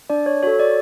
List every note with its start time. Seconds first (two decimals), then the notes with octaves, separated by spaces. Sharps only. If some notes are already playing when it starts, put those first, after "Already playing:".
0.10 D4 D5
0.26 C#5
0.43 F#4 A4 C#5
0.60 D5